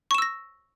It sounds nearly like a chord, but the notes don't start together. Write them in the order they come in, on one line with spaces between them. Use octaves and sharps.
C#6 E7 E6 A#6